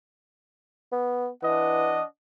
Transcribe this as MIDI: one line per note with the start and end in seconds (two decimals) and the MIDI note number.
0.92 1.28 59
1.43 1.98 52
1.43 2.04 62
1.43 2.04 75
1.43 2.04 78